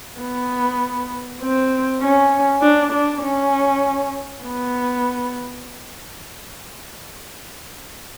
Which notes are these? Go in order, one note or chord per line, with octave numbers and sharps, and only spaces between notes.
B3
C4
C#4
D4
D4
C#4
B3